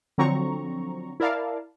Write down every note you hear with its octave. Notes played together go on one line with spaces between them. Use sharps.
D3 F3 F#3 C4 A#5 C#6
E4 A#4 D5 F5 A5